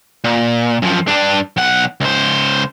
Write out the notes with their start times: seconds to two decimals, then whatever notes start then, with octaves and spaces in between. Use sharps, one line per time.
0.24 A#2
0.82 F#2 F3
1.08 G2 D4
1.57 B1 F#5
2.00 C#2 C5